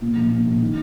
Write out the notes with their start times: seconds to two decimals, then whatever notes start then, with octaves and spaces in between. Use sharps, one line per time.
0.01 A#2
0.16 A#1
0.31 A#2
0.46 A#1
0.61 D#3